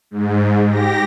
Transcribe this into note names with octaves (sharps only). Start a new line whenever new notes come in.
G#2
G4 A#6